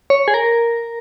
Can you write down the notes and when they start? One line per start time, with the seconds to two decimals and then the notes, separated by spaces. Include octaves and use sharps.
0.10 C#5
0.28 G#4
0.34 A#4